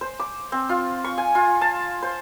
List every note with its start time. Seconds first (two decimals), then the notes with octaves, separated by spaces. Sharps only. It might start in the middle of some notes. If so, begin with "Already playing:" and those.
0.01 C5
0.20 D6
0.52 C4
0.69 F4
1.05 C#6
1.18 G#5
1.35 F4
1.61 A5
2.03 C5